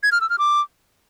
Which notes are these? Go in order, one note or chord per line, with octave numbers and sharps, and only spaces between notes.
G#6
F6
E6
F6
D6